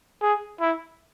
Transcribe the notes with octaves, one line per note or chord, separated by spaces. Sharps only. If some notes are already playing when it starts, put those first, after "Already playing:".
G#4
E4